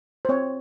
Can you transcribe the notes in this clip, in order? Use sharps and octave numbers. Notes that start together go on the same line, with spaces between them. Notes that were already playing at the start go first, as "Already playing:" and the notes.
C5
C4 C#5